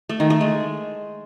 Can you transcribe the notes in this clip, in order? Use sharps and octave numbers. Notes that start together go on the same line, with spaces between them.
A3
D#3
A3
G#3